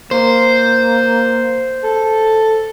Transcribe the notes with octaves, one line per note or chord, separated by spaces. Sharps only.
A#3 C5
A4